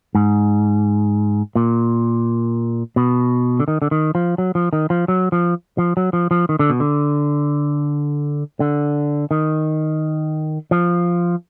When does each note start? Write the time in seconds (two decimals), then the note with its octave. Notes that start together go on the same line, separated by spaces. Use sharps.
0.15 G#2
1.55 A#2
2.96 B2
3.60 D3
3.68 D#3
3.82 D3
3.91 D#3
4.15 F3
4.38 F#3
4.55 F3
4.73 D#3
4.90 F3
5.08 F#3
5.32 F3
5.78 F3
5.97 F#3
6.13 F3
6.31 F3
6.49 D#3
6.59 D3
6.70 B2
6.80 D3
8.60 D3
9.31 D#3
10.71 F3